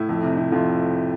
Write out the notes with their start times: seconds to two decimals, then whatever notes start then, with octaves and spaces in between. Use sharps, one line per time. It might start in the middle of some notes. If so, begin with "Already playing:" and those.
Already playing: A2 E4
0.09 F2
0.23 C3
0.37 C3 E4
0.52 F2 F4